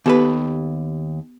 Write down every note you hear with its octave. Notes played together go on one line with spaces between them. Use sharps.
D#2 B3 G4 A4 B4